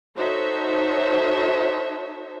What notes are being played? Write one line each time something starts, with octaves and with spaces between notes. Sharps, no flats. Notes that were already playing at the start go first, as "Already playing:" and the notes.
D#4 F#4 A4 C5 C#5 E5